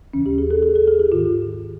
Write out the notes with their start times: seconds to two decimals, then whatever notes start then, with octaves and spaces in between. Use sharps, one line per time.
0.13 D#2 C#3 E3 C#4
0.26 G4
0.38 G#4
0.51 A4
0.63 G#4
0.75 A4
0.88 G#4
1.00 G4
1.12 G#2 D#3 F4